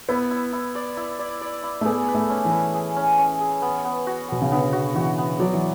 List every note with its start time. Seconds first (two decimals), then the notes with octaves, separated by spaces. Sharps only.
0.09 B3 E4
0.31 E4
0.53 E4
0.75 D5
0.97 E4
1.19 D5
1.41 D5
1.63 E4
1.81 A3
1.85 B3 G#4
2.08 B4
2.15 A3
2.30 C#4
2.45 E3
2.52 B4
2.74 G#4
2.96 C#4
3.18 C#4
3.40 G#4
3.62 B3
3.85 B3
4.07 F#4
4.28 B2 B3
4.42 C#3
4.51 D3 B3
4.73 F#4
4.95 E3 F#4
5.18 B3
5.40 F#3 D5
5.53 E3